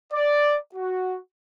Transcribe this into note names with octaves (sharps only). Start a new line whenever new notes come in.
D5
F#4